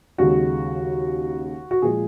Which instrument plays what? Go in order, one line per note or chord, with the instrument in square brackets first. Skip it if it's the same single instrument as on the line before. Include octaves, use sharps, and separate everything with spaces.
[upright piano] D#2 C#3 G#3 F#4
F#4
A#2 F3 G#3 G#4